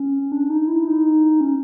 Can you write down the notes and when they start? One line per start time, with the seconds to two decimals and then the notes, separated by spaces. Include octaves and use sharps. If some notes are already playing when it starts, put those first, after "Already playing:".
Already playing: C#4
0.32 D4
0.50 D#4
0.68 E4
0.87 D#4
1.41 C#4